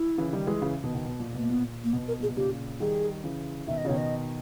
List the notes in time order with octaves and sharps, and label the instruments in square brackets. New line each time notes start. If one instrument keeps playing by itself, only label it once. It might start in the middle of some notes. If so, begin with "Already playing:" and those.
Already playing: [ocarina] E4
[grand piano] C#3 E3
D#3 G3
E3 G#3
C#3 E3
B2 D#3
B2 D#3
B2
A#2
[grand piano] B2 [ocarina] A#3
[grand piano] A#2 [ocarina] B3
[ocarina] A#3
[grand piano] B2 [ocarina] B3
[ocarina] A#4
[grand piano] A#2 [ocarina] G#4
[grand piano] B2
[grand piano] A#2 C#3 [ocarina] G4
[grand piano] D#3 G3 [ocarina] G#4
[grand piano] C#3 E3
[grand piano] B2 D#3 [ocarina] E5
[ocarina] D#5
[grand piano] C#3
[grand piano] B2 D#3 [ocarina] C#5
[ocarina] D#5